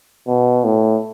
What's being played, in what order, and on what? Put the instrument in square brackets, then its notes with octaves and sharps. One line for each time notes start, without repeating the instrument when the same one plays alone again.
[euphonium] B2
A2